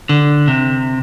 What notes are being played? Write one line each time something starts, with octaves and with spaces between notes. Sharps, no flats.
D3
C3